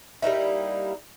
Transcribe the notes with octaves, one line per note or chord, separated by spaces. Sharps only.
G3 A#3 D#4 E4